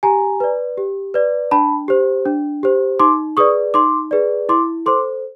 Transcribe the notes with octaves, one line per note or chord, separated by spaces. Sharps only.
G4 G#5 A#5
B4 D5
G4
B4 D5
D4 A5 B5
G4 C5
D4
G4 C5
D#4 C6 D6
G#4 B4 D5 C#6 D#6
D#4 C6 D6
G#4 B4 D5
E4 C6 D6
A4 C5 C6 D6